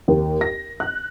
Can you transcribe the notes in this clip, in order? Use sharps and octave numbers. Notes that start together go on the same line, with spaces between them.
D#2
A#6
F#6